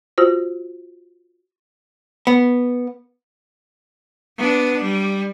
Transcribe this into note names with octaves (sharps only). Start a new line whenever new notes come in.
F4 F#4 C5
B3
B3 D4
G3